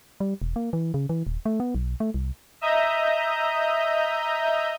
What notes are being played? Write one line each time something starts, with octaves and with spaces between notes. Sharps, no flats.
G3
E1
A#3
E3
C#3
E3
D#1
A3
B3
B1
A3
C2
D#5 E5 A#5 D#6 G6